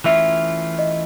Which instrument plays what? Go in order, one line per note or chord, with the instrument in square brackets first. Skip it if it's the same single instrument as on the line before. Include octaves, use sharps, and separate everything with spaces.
[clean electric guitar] E3 A3 C#4 F4 [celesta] E5
[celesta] D#5